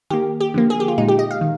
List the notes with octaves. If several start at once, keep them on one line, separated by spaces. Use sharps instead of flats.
D#3 A#3 G4
G4
D3 F3 A#3
G#4
G4
F4
A#2 G#3 D#4
G4
D#5
F5
D#3